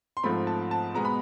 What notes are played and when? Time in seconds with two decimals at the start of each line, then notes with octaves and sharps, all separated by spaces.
0.17 C6
0.23 G#2 F3 A3 C4 B5
0.47 A5
0.71 A5
0.94 B2 G#3 B3 A#5
1.05 B5